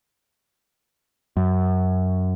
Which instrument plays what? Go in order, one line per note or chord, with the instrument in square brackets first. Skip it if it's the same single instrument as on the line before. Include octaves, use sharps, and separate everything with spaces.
[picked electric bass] F#2